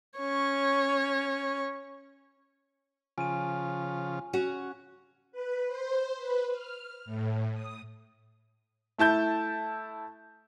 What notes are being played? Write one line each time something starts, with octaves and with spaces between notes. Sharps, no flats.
C#4 C#5
C#3 F3 F4 G#5 D#7
C#4 F#4 F#5
B4
C5
B4
F6
A2
D#6
A3 E4 A5 G6